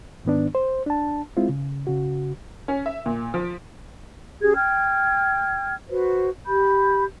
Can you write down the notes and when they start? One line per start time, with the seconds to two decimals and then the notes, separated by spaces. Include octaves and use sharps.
0.25 G#2 D#3 B3 D4
0.55 C5
0.86 D4 A5
1.37 G#3 C4 E4 F4
1.49 C#3
1.87 C#3 F#4
2.68 C#4
2.86 E5
3.06 A#2
3.34 F3
4.41 C#4 G4 G#4 G#6
4.55 G5 F6 G#6
5.90 F#4 B4 C5
6.46 G4 B5 G6